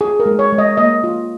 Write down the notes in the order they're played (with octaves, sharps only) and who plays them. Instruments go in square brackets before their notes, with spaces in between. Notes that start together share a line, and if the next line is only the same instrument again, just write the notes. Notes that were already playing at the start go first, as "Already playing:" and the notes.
[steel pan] F4 G#4
A#4
G#3
C#5
G#3
D#5
A#3 D#5
F4